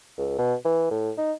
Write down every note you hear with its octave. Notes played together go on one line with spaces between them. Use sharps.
C#2
B2
E3
A2
D#4